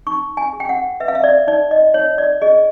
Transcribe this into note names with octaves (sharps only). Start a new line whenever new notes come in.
D#4 C#6
G#5
G#4
G5
F#5
B4 E5
F5
E5
D5
D#4 D5
D#5
D#4 C#5
D5
G#4 D#5